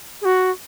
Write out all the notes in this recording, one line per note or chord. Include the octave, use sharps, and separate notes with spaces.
G#4
F#4